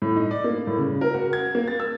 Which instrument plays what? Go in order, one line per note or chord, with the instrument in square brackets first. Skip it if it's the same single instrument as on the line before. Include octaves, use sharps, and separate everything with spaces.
[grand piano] A2
D#4
D5
A#3
A2
C#3
A#4
F#4
G#6
A#3
A6
E6